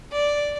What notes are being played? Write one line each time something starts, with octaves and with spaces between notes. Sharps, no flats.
D5